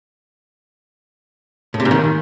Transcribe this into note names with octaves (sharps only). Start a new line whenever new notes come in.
A2
C3
G#2
D#3